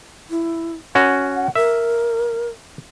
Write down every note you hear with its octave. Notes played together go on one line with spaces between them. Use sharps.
E4
C#4 F#4 F#5
A#4 E5